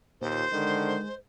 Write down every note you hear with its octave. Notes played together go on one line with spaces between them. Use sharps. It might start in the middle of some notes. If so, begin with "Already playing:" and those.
D#2 A#2 C5
D3 D#3 G#3